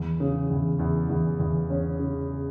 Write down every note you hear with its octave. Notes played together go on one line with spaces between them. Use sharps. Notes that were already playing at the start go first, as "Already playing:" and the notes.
Already playing: E2
C#3
E2
E2
E2
E2
C#4
C#3